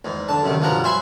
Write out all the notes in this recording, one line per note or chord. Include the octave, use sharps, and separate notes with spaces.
E2 G#2
D3 A5
F#2 C3 D#3
B1 G2 F3 G3 F#5 A#5
C5 E5 G#5 B5 C6